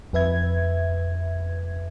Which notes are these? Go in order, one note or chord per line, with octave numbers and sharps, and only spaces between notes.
F2 B4 E5 G#6